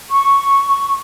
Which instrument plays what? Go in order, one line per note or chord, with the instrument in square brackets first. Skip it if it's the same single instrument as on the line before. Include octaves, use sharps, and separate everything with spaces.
[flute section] C#6